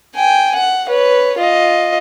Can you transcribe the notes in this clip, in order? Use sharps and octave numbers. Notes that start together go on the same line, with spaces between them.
G5 G#5
F#5
B4 C#5
F4 D#5